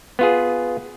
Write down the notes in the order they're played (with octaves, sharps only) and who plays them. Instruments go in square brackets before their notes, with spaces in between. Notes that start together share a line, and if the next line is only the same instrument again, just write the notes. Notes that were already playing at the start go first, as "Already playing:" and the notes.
[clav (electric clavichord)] B3 F4 G#4